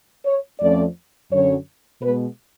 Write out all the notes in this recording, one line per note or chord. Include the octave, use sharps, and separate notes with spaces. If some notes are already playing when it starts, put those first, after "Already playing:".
C#5
F2 F3 A3 C#4 D5
F#2 D3 F#3 C#4 C#5
B2 G#3 B3 B4